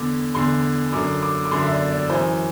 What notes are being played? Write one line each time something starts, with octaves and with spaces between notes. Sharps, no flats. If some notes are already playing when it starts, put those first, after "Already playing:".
Already playing: E2 D3 D6
E2 D3 C6
F#2 D3 D6
D6
D6
F#2 D3 C6
E5
D5
D5
F#2 E3 C5